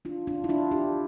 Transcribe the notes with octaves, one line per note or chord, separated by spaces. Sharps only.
D4 F4
D4 F4
E4
D4 F4
E4 G4